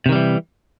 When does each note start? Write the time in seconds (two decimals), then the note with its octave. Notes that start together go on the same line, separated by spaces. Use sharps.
0.06 C3
0.09 D#3
0.12 G3
0.15 E3